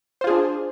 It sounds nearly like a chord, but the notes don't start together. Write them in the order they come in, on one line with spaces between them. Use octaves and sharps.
C5 F4 G#4 D4